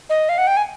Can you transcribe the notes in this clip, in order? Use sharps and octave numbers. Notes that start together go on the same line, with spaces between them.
D#5
F5
F#5
G5
G#5